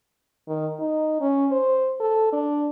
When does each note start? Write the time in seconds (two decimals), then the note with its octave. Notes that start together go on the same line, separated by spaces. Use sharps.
0.48 D#3
0.80 D#4
1.21 C#4
1.52 C5
2.00 A4
2.33 D4